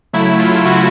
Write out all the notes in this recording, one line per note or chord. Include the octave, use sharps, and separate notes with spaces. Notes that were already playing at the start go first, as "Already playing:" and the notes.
C#3 F#3 A3 E4
F4
C#3 F#3 A3 F#4